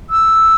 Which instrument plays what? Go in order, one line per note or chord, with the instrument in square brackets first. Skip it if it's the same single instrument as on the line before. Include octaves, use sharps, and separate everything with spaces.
[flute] E6